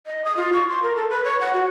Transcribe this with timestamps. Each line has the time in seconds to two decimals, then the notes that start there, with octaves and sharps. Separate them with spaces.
0.07 D#5
0.25 D#6
0.37 F4
0.53 C#6
0.70 C6
0.83 A#4
0.96 A4
1.10 B4
1.24 C#5
1.41 F#5
1.53 F#4